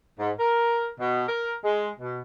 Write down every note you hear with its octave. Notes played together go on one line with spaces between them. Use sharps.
G#2
A#4
B2
A#4
G#3
B2